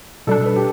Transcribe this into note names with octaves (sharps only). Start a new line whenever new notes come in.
B2 G3 D4 A4
B4
G4